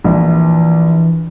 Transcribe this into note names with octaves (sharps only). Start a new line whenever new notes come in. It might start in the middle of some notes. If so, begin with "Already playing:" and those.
A#1 E3